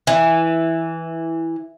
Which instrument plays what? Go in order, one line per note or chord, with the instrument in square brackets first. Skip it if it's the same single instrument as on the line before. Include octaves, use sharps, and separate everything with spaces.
[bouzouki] E3